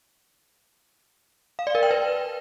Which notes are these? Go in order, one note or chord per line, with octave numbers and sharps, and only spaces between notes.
F5
D5
A#4
G5
B4